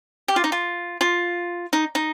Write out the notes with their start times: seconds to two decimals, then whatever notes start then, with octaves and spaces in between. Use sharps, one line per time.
0.28 G4
0.36 F4
0.44 D#4
0.52 F4
1.01 F4
1.73 D#4
1.95 D#4